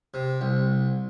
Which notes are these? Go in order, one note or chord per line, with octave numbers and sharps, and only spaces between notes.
C3
C2